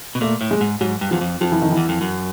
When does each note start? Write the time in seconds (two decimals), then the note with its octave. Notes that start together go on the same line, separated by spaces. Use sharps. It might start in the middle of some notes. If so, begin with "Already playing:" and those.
0.15 B2
0.21 A#2 A3
0.41 A2
0.51 G#3
0.61 G#2
0.81 G#2 F#3
1.01 G2
1.11 E2 F3
1.21 F2
1.41 F2 F3
1.52 E3
1.62 D#3
1.71 E3
1.77 E2
1.89 F2
2.01 F#2